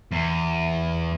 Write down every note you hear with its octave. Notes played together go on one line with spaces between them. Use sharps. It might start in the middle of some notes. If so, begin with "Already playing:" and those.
E2